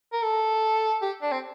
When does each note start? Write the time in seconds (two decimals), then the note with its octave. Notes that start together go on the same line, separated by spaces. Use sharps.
0.13 A#4
0.23 A4
1.02 G4
1.22 D4
1.32 C4